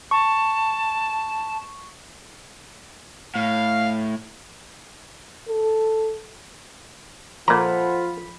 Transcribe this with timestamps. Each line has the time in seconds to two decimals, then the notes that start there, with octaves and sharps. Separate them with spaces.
0.11 A5 C#6
3.35 A2 F5
5.49 A4
7.48 A#2 F3 F4 A4 C5 F#5 A#5 B5